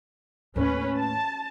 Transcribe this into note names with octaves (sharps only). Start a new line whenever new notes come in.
D#2 A2 C#4 B4
A5